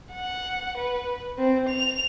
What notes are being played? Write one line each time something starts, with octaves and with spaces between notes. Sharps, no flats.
F#5
B4
C4
F7